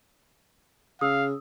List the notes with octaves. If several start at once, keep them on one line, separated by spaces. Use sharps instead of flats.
C#3 F5 D#6 E6